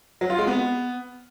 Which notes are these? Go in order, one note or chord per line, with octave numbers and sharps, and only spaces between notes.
F#3
F4
G#3
B3